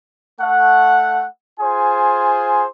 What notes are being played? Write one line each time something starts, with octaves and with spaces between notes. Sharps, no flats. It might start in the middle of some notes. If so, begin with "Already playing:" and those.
A3 F#5
F4 G#4 C5 G#5